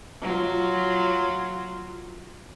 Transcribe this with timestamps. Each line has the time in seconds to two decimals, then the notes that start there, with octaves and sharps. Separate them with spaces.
0.22 F#3 F4